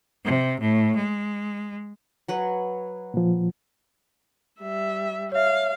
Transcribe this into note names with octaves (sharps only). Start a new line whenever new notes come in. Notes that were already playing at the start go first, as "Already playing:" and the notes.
C3
A2
G#3
F#3 B4 C#5
A#2 F3
G3 E5
C#5 E5 F5